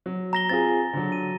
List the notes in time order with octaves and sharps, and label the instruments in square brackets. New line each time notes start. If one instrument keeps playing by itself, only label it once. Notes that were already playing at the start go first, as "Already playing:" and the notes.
[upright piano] F#3
[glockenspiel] A#5 A#6 G7
[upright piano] C4 F4 G#4 [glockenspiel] A6
[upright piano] D3 F#3
[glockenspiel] D#7